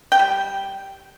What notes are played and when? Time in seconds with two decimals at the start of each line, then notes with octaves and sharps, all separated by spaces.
0.12 G5
0.19 G3